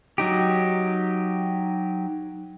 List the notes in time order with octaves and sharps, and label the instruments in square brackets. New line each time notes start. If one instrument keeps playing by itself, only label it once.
[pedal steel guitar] F#3 D#4 G4